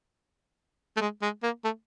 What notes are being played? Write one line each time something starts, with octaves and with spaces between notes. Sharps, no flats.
A3
G#3
G#3
A#3
A3